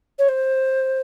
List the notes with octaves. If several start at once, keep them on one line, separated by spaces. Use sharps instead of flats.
C#5
C5